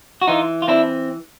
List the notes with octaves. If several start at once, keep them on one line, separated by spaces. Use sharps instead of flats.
F#4
E3 D#4 F4
F4
C4 D4 E4